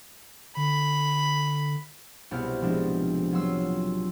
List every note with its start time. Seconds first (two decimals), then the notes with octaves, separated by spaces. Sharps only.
0.57 D3 B5
2.31 C2 B2 B3 C4 E4 F6
2.61 A2 F3 G#3 D4
3.33 F#3 F4 C6 E6